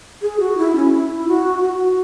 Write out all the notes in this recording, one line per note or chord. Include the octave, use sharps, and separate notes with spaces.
G#4
F#4
E4
C#4
E4
F#4
F#4